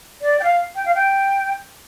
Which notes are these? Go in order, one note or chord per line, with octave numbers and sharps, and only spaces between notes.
D5
G5
F5
G5
F5
G5